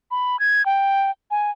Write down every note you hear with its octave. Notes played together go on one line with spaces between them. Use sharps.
B5
G#6
G5
G#5